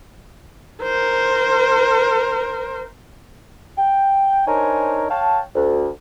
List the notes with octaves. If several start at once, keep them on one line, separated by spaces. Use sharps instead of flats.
A#4 C5
G5
D4 D#4 A#4 C5 C#5 G#5
C#5 F5 G5 A5
D2